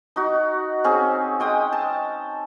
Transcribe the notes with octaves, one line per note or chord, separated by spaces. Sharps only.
D#4 F#4
C4 C#4 G#4
G#3 G5 D#6
A5